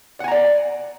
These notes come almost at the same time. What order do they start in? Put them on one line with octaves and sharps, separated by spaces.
F#5 G#5 A#5 D5